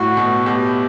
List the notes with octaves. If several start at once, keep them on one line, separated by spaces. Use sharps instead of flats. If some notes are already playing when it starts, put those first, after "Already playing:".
Already playing: A2 F#4
B2
B2 G4